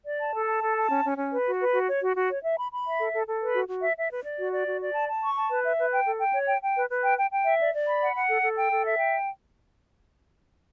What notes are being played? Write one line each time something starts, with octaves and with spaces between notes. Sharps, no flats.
D5
A5
A4
A5
A4
A5
C#4
C#4
C#4
B4
F#4
B4
F#4
C#5
F#4
F#4
C#5
E5
B5
B5
E5
A4
A4
A4
B4
F#4
F#4
E5
E5
B4
D5
F#4
D5
F#4
D5
A5
A5
C#6
A5
B4
E5
B4
G5
A4
G5
C#5
G5
G5
B4
B4
G5
G5
G5
E5
D5
D5
B5
F#5
F#5
A4
A4
G5
A4
E5
G5